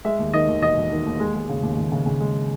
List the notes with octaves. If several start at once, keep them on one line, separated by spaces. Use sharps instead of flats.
G#3 E5
D#2
D#3 D#5
D#2
E1 D#5
E1
D#3
D#2
G#3
G#3
C#3
D#2
D#2
C#3
C#3
G#3